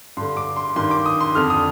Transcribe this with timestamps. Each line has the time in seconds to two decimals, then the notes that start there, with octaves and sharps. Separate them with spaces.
0.17 G2 D3 C6
0.37 D6
0.56 C6
0.76 G2 D#3 C6
0.91 D6
1.06 D#6
1.21 C6
1.35 F2 D3 F6
1.50 D#6